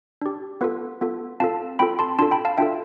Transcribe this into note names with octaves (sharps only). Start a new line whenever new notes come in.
D4 G4
B3 F4 A4 B4
B3 F4 A4
C4 F4 A4 F5 A5
C4 F4 A4 G5 B5
A5 C6
D4 F4 A4 A5 C6
G5 B5
F5 A5
D4 F4 A4 E5 G5